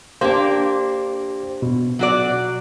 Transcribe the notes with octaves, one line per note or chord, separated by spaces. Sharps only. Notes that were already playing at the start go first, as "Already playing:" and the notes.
A#3 D4 G4 C5
B2
F#3 F#4 D5